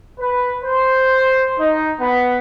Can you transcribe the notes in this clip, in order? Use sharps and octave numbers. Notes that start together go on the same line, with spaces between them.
B4
C5
D#4
B3